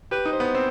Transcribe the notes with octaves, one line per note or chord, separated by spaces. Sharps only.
G4 B4
D#4
C5
B3
C4